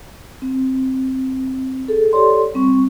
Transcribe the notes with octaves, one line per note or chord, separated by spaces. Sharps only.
C4
G#4 A4
G4 A4 C#5 D5 C6
G3 C4 C#6